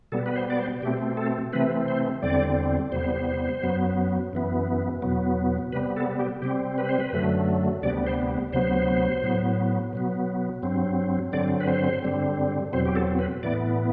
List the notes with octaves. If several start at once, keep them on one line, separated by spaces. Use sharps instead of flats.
B2 G3 B3 A4
B4
C5
D5
C5
B2 A3 C4 G4
A4
C3 E3 A3 C4 B4
C5
E2 D3 G3 C4 D5
E2 C3 G3 B3 C5
F#2 F#3 B3
F#2 E3 B3
E2 B2 F#3 B3
C3 G3 B3 B4
A4
G4
C3 G3 C4 G4
B4
C5
B4
F#2 D3 F#3 A3
D2 C3 G3 B3 D5
C5
D2 C3 F#3 B3 C5
A2 F#3 B3
B2 F#3 B3
G2 F#3 C4
G2 D3 F#3 C4 D5
B4
C5
G2 D3 G3 C4
E2 B2 F#3 C4 C5
G4
A4
B4
A2 E3 B3 D5